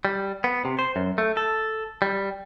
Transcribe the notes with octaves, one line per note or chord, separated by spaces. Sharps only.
G3
B3
C3
C5
F#2
A3
A4
G3